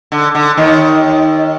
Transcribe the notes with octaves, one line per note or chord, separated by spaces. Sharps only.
D3
D3
D#2 D#3